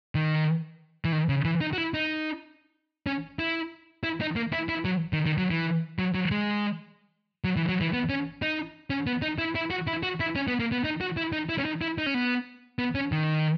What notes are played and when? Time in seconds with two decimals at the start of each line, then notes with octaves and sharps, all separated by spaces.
0.15 D#3
1.05 E3
1.12 D#3
1.29 C#3
1.45 E3
1.61 D#4
1.73 F#4
1.78 E4
1.94 D#4
3.07 C#4
3.39 E4
4.04 E4
4.21 D#4
4.36 A#3
4.53 E4
4.69 E4
4.85 F#3
5.13 D#3
5.26 D#3
5.38 F#3
5.51 E3
5.99 F#3
6.15 F#3
6.31 G#3
7.44 F#3
7.56 E3
7.69 F#3
7.81 E3
7.93 B3
8.09 C#4
8.42 D#4
8.90 C#4
9.07 B3
9.22 D#4
9.38 E4
9.55 E4
9.71 F#4
9.87 E4
10.03 F#4
10.20 E4
10.36 C#4
10.48 B3
10.60 A#3
10.72 B3
10.84 D#4
11.01 F#4
11.17 E4
11.33 D#4
11.49 E4
11.58 C#4
11.65 D#4
11.82 E4
11.98 D#4
12.06 C#4
12.14 B3
12.79 B3
12.95 C#4
13.12 D#3